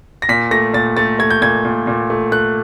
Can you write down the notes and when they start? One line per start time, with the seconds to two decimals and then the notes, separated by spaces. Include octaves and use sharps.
0.22 A#6
0.29 A#2 B6
0.51 A3 A#6
0.73 A#2 A6
0.97 A3 A6
1.19 A3 G#6
1.30 G6
1.42 A#2 G#6
1.65 A#2
1.87 A#2
2.10 A3
2.32 A3 F#6